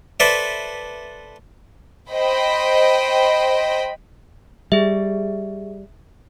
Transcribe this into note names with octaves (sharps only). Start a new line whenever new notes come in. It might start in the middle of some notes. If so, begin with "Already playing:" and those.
A4 B4 C5 D5 E5
C5 D#5 G5 B5
G3 G#4 E5